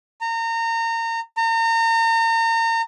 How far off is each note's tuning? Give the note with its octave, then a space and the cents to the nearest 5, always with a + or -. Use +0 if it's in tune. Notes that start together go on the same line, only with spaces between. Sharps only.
A#5 -30
A#5 -35